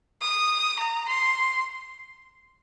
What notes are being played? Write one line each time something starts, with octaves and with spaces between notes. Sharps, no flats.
D#6
A#5
C6